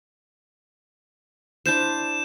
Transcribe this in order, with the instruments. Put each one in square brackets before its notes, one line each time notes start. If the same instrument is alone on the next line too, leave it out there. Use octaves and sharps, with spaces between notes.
[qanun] D4 E4 C5 [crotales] G6 E7